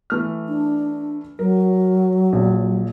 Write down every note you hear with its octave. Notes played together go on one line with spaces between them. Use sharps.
E3 A3 F6
D4
F#3 A#4
A#1 A#2 F3